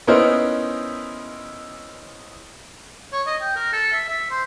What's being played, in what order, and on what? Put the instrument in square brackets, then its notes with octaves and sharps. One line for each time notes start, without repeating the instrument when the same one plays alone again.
[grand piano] B3 C#4 D#4 E4 A#4 C5
[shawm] C#5
D#5
G5
A#4
A4
E5
E5
C5